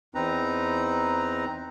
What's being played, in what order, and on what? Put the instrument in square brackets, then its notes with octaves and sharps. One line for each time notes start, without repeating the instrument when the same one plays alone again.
[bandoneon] E2 C4 D#4 B4 A#5